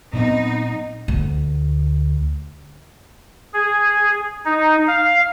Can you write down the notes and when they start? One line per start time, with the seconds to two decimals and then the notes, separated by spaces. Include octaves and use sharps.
0.13 A#2 F#3 B3 C4 D#4
1.08 D2
3.54 G#4
4.45 D#4
4.87 F5